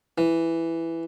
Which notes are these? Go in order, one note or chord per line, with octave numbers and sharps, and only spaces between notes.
E3